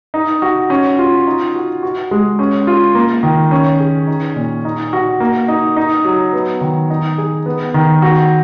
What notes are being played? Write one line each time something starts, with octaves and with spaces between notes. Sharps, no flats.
D#4
F#4
C#4
F4
D#4
F#4
F#4
G#3
C#4
F4
A#3
D#3
C#4
G#4
D#4
A#2
D#4
F#4
A#3
D#4
D#4
F#3
B3
D#3
D#4
G#4
B3
D#3
F#4